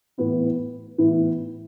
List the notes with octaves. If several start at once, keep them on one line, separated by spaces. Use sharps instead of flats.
A2 E3 B3 E4
A2 E3 B3 E4